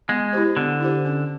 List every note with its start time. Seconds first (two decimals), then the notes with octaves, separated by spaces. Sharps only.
0.09 G#3 B3
0.33 E4 G4 C5
0.57 D3 B3
0.80 E4 G4 C5
1.05 C#4